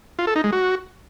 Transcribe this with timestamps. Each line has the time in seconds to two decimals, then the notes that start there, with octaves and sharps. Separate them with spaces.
0.19 F4
0.27 A4
0.36 D#4
0.44 G#3
0.53 F#4